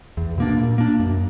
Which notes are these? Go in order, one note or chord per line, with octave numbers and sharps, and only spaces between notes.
E2
B2 A#3 D4
A#2
A#3 D4
F#2